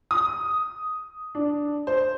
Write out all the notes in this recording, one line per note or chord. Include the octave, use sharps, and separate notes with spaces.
D#6
D4
C5